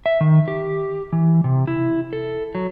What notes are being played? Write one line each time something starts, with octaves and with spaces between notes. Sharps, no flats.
E5
D#3
G4
E3
C3
E4
A4
F#3